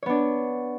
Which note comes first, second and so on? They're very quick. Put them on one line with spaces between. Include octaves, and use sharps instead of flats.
C#5 B3 D4